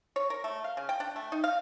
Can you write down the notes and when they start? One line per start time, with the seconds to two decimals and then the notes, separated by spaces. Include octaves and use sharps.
0.16 C#5
0.30 A#4
0.44 A3
0.64 F5
0.77 C#3
0.89 G5
1.00 D4
1.16 A3
1.32 D#4
1.44 F5